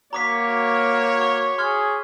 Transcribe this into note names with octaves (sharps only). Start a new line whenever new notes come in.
A#3 F#4 C#5 A#5 D6 B6
C#6
G#4 C6 F6 G#6